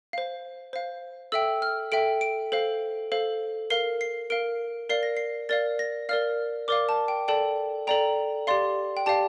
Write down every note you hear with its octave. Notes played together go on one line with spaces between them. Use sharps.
C5 F5
C5 F5
A4 E5 G5 E6
F6
A4 E5 G5 D7
D7
A4 C5 F5
A4 C5 F5
A#4 F5 C7
C7
A#4 F5 D7
A#4 D5 F5 C7
A#6
C7
A#4 D5 F5 A6
A#6
A#4 D5 F5 F6
A#4 D5 F5 D6
A5
G5
A4 D5 G5 A5
A4 D5 G5 A#5
G4 D5 F5 C6
G5
G4 D5 F5 A5